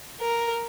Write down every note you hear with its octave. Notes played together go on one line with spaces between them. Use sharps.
A#4